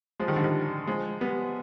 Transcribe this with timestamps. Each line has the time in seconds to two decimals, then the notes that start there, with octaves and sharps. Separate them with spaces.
0.20 F3 G#3
0.27 D#3 G3
0.36 D3 F3
0.44 D#3 G3
0.87 F3 G#3
1.21 G3 B3